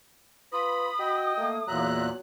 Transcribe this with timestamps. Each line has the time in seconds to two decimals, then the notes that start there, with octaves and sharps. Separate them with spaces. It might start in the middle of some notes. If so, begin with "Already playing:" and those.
0.53 F4 B4 B5 D#6
0.99 F#4 D#5 G5
1.37 A3 A#3
1.68 E2 A#2 F#3 E5 A#5 F#6